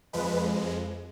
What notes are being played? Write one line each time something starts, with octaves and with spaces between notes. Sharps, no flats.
F2 F3 G#3 B4